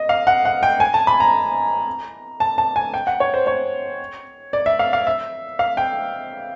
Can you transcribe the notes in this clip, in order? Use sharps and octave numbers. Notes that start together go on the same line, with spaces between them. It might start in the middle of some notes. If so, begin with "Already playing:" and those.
Already playing: D#5
F5
F#5
F#5
G5
G#5
A5
B5
A#5
A5
A5
G#5
G5
F#5
C#5
C5
C#5
D5
E5
F5
F5
E5
F5
G5